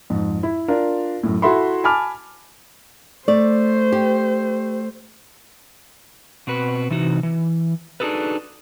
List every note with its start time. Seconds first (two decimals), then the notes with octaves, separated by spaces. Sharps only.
0.10 F2 G#2
0.43 E4
0.68 D4 F4 A#4
1.23 F#2 A2
1.42 E4 F#4 A4 E5 B5 C6
1.84 G#5 A5 B5 D6 F6
3.28 A3 C5 D5
3.92 G4
6.47 B2 C4 F#4 B4
6.90 C3 E3 D#4 F#4
7.23 E3
8.00 D4 D#4 F#4 G#4 A4 B4